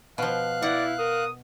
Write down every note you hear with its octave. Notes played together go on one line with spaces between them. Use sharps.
B2 F3 F5 F#6
E4 D5 F#5
A#4 D#6